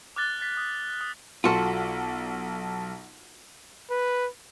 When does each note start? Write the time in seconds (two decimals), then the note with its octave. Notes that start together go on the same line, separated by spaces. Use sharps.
0.16 D6 F6 F#6 A6 G7
0.41 A6 B6
0.57 D#6
1.01 D#6
1.44 B1 F4 F#4 A4
3.90 B4